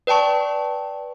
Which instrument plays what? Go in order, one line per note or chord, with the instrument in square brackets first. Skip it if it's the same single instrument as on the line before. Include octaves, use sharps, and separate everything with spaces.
[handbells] B4 D5 G5 A5 C#6